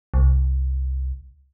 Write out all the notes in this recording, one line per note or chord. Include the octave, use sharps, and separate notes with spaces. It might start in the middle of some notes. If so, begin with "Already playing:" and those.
C2